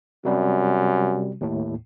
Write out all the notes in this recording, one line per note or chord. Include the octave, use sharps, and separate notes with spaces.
F#2 C3 G3
D#2 A2